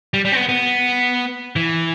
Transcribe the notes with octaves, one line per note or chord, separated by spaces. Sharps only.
G3
G3
C4
B3
B3
E3